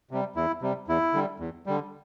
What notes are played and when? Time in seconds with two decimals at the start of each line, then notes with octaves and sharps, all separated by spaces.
0.11 C3 G3
0.36 E2 E4
0.62 C3 G3
0.88 E2 E4
1.14 D3 G3
1.40 E2
1.66 D3 G3